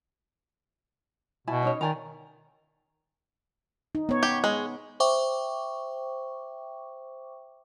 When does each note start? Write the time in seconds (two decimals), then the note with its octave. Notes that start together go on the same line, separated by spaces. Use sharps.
1.47 B2 E4 G#5 A5
1.63 C#4 D#4 C#5
1.81 D#3 D5 G#5 A#5
3.95 D#4
4.09 B3 C#5
4.23 G4
4.44 G#3
5.00 C5 E5 G5 C#6 D6